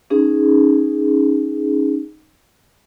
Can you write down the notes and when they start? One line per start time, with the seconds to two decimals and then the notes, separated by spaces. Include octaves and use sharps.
0.10 C#4 D#4 G#4